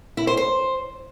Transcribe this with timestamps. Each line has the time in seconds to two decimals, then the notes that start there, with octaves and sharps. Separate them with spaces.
0.17 E4
0.27 C5
0.37 C5